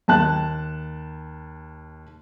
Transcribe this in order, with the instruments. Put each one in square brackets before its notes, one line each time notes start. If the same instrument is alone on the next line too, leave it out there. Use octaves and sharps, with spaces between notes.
[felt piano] D#2 A5 F#6